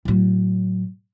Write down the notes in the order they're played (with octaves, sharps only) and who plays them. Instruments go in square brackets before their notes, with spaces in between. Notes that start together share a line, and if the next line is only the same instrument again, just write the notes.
[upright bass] A2 F#3